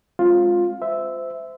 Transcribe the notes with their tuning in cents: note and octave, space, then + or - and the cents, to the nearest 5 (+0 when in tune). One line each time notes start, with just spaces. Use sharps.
G#3 +0 C4 +35 F4 +10
C5 -25 E5 -5